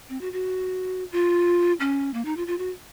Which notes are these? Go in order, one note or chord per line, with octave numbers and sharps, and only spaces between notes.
C4
F#4
F#4
F4
C#4
A#3
D#4
F4
F4
F#4